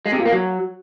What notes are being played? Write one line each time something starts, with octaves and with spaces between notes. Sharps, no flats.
G#3
C3
A#2
A#3
F#3